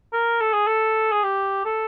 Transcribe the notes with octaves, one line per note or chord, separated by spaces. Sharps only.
A#4
A4
G#4
A4
G#4
G4
A4